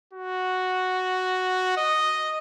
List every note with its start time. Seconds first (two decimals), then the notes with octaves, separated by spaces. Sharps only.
0.13 F#4
1.77 D#5